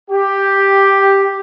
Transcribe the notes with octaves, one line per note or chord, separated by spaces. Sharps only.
G4